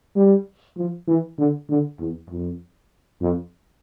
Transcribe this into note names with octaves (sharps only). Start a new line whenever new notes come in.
G3
F3
E3
D3
D3
E2
F2
F2